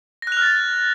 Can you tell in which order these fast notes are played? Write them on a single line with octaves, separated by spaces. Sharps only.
A#6 F#6 F7 F6 A6